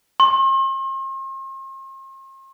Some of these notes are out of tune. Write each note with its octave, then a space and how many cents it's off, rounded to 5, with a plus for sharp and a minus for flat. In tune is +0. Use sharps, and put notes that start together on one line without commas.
C6 +45